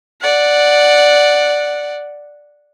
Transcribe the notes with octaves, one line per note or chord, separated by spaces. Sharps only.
D5 F#5